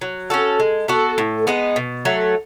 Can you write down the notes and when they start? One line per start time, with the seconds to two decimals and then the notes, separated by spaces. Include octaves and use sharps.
0.01 F#3
0.30 C#4 F#4 A4
0.60 G#3
0.88 B3 F#4 A4
1.18 A2
1.47 G#3 B3 D#4
1.76 B2
2.05 F#3 A3